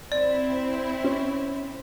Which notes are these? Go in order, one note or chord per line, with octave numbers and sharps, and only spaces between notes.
C4 E4 D5
C#4